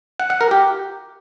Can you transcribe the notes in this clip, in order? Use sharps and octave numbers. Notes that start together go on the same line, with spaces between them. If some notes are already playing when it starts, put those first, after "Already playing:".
F#5
F#5
A#4
G4